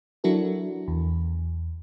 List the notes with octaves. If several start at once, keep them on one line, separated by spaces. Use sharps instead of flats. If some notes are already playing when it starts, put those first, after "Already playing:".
F#3 D4 E4 F#4 A4 A#4
E2